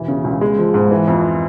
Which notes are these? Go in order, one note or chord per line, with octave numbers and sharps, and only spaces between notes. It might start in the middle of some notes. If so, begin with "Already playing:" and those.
Already playing: E1 E3
C#3
C#2
G#3
F3
G#2
E3
F2